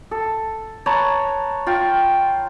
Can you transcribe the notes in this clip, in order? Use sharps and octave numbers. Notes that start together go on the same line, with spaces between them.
A4
B4 C#5 A5 A#5
F4 G5